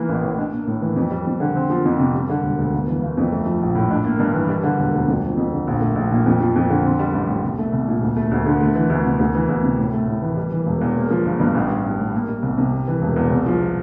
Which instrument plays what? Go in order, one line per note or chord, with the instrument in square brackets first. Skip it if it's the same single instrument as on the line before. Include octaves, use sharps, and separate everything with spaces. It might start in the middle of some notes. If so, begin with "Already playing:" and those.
Already playing: [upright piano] E3 A#3
A1
A2
D4
A#3
A2
E3
F2
G3
F2
D3
C4
F3
F2
C3
G3
D3
E1
D2
G1
E3
G1
F2
A3
F3
A#1
A2
D4
A#3
G2
E3
G3
D3
E1
D2
F2
F3
F2
D3
A#1
A3
A#1
A#2
F2
F3
F2
D3
C4
G3
A1
A2
C2
A3
C2
A#2
D2
A3
D2
D3
A3
E3
D2
C3
D2
E3
D2
C3
A2
A3
A2
E3
G3
E3
E1
E2
A#3
F3
G1
G2
A1
G3
A1
A2
A#3
G3
C2
C3
G3
E3
E1
E2
C2
F3